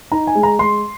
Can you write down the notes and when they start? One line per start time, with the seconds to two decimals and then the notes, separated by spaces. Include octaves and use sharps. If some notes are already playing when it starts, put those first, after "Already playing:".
0.12 D#4 A#5
0.27 G#5
0.35 G#3
0.43 A#5
0.59 G#3 C6